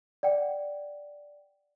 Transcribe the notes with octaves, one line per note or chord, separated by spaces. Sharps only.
D5 F#5 G5